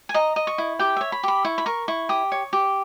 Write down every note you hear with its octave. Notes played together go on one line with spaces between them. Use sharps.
G#5
D#5 A#5
D#5
C#6
E4
G4 G5
C#5 E5
B5
G4 B5
E4 C#6
B5
A#4 C#6
E4 C#6
G4 D#6
C#5
G4